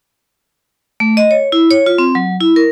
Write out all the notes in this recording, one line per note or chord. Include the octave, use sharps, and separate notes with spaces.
A3
D#5
C#5
E4
C#5
F4
C4
F#3
E4
A#4